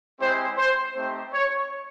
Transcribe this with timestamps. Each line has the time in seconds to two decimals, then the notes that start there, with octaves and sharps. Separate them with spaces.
0.20 G#3 C4 E4 G4 C5
0.58 C5
0.95 A3 C4 D#4 G4 C5
1.33 C#5